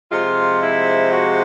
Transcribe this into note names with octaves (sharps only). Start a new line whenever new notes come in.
C3 F3 G#3 F4
E4
F#4